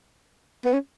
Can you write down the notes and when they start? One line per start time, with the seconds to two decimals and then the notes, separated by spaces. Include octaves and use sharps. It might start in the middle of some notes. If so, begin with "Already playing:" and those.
0.65 B3
0.74 C#4